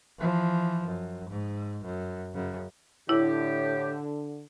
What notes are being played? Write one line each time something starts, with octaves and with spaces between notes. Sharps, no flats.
E3 F3
F#2
G#2
F#2
F#2 C#3
A2 D3 E4 G4